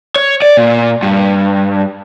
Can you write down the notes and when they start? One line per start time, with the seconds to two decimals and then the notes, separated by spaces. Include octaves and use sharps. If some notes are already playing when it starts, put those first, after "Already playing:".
0.16 C#5
0.42 D5
0.57 A#2
1.03 G2